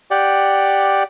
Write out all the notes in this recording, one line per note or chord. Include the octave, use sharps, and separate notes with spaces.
G4 D5 F#5 G5